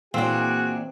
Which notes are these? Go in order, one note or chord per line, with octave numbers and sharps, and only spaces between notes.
A#2 E3 C4 D4 F#4 G#4